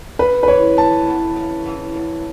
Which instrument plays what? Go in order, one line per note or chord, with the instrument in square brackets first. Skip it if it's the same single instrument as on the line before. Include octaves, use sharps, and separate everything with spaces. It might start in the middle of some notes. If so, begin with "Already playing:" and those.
[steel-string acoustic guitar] C#3 [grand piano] B4
[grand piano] B4
[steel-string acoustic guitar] E3 [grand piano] C#5
[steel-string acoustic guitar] E2 [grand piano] A5
[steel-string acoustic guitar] E2
C#3
E3
E2